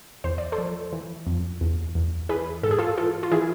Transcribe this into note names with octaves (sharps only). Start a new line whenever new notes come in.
E2 C5
D5
A4 C5
F3
E3
F2
E2
E2
E3 G#4 B4
G#2 A4
G#4
F4 A4
E3 F4 A4
F4
E3 E4 G#4